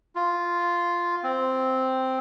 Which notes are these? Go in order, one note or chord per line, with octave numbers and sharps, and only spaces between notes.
F4
C4